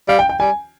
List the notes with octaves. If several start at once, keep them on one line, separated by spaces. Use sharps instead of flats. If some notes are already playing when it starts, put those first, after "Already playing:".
G3 F5
G5
G5
G3 G#5